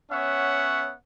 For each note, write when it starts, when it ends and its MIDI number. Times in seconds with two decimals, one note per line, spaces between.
0.11 0.93 59
0.11 0.93 61
0.11 0.93 73
0.11 0.93 76
0.11 0.93 78